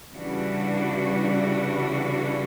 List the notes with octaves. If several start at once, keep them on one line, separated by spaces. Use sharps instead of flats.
C#3 E3 G3 D4 F#4